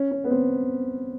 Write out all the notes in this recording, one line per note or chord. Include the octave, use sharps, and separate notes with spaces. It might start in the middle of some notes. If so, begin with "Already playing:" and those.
Already playing: C#4
C#4
B3
C4